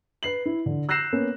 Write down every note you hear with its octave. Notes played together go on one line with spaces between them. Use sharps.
B4 C7 F#7
E4
D3
E6 F#6 G6 A#6 C7 E7
A#3 B3 C#4